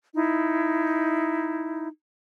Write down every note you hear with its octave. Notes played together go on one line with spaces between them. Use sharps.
D#4 E4